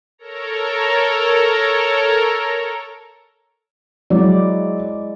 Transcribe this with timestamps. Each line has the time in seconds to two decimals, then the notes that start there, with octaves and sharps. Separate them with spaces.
0.18 A4 A#4 C#5 A#5
4.10 F#3 G#3 E4 D5